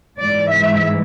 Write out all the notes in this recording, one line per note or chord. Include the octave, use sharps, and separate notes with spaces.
G#2 E3 G#3 D5
E5